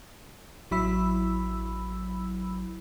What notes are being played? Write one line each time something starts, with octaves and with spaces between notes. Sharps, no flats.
A1 F#3 E4 B5 E6